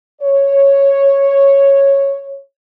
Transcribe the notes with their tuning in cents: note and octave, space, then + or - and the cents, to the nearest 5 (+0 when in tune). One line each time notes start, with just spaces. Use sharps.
C#5 -5